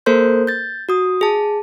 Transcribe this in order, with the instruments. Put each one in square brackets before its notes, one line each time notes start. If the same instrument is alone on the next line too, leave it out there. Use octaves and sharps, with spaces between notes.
[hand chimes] A#3 A4 A#4 C5 C6 G6
G6 A6
F#4 D#6
G#4 A5